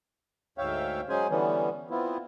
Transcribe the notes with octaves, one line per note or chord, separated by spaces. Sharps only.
D2 G#2 C#5 E5 F5 G5
F#3 G#3 C#4 G#4 C5 G#5
D3 E3 G3 B3 C#4
B3 C4 E4 F4